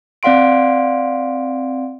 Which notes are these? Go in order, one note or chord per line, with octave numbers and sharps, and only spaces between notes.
C4 D5 F5 F#5 C6 D7